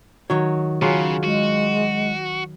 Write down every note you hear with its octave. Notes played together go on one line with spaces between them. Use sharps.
D#3 F#3 C#5
C#3 F#3 F4 G#4
G#3 F#4